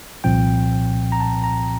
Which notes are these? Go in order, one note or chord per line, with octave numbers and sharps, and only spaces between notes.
C2 A#2 F3 C4 G5
A#5
A5
A#5